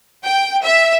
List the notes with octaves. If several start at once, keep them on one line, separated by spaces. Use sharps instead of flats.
G5
E5